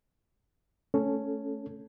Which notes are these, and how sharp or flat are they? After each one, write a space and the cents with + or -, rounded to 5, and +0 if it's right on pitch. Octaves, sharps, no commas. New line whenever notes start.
A3 +0 C#4 +0 A4 +0